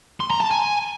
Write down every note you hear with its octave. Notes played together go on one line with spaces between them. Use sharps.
C6
A#5
A5
G#5